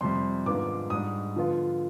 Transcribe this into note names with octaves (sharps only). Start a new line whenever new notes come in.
F2 C3 G3 C6
G#2 D#3 B3 D4 F4 D6
G#2 G3 D4 D#6
D3 F3 B3 F4